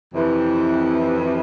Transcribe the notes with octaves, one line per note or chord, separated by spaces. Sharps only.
F2 C3 E3